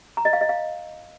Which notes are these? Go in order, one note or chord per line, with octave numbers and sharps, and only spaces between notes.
A#5
D#5
F5
D#5
F5